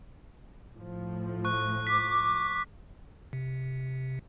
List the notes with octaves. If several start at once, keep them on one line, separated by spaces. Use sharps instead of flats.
A2 F3
C#6 F#6
D6 B6
C3